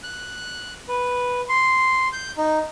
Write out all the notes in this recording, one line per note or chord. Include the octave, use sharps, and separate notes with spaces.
F#6
B4
C6
G6
D#4